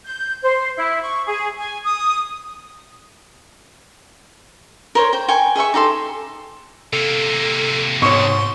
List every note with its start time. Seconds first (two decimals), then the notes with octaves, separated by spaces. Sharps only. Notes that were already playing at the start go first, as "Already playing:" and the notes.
0.05 G6
0.43 C5
0.77 E4
1.02 C#6
1.26 G#4
1.58 G#5
1.85 D#6
4.95 A#4 C5 C#5
5.13 C5 G5
5.28 G5 G#5 C#6
5.56 G#4 D#5 E5 C#6
5.74 D#4 G4 A4 C6
6.93 C3 A#3 A4
8.02 G#2 B2 C#5 C6 C#6